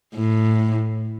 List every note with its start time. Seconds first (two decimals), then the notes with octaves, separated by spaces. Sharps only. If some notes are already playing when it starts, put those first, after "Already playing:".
0.15 A2